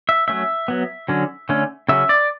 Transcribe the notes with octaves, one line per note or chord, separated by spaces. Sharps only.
E5
F#3 A3 C#4 E5
F#3 B3
D3 F#3 C#4
D3 A3 C#4
C#3 F#3 C#4 E5
D5